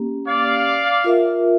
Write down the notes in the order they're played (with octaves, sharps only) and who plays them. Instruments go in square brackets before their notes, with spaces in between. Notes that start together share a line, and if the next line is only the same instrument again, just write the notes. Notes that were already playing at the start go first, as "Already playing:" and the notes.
Already playing: [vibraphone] A#3 C#4 G4
[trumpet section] D5 F5
[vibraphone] F4 A#4 E5